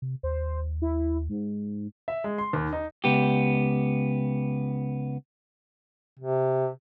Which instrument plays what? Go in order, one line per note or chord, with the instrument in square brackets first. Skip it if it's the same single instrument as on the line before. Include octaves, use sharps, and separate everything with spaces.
[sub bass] C3
[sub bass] D#2 [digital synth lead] C5
[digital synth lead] E4
G#2
[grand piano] E5
G#3
C6
D#2
D#4
[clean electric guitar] C#2 B3 G4
[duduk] C3